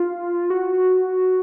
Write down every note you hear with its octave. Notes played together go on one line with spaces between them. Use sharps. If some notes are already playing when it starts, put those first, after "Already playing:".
Already playing: F4
F#4